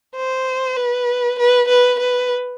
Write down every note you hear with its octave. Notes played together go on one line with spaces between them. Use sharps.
C5
B4
B4
B4
B4